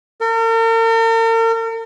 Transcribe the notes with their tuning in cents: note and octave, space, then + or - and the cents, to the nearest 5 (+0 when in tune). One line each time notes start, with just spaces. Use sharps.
A#4 -45